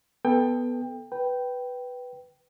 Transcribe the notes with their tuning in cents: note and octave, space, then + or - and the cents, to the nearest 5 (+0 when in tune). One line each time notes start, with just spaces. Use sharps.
B3 +0 A4 +0 G5 +25
B4 +0 G5 -10